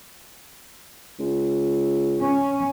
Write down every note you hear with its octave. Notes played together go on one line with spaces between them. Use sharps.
C#2
C#4